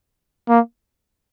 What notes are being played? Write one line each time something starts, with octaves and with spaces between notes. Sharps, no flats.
A#3